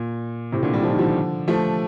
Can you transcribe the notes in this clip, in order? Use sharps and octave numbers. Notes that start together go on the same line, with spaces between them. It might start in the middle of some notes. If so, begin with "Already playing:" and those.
Already playing: A#2
A2 C3
A#2 D3
G3
F3
D#3
D3 F3
F3 A3